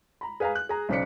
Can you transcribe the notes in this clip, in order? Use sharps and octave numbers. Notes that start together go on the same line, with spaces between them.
A#5 B5
G#4 B4 F5 G#5 A#5
F#6
G#4 A#5
B1 C#3 C5 D5 B6 C#7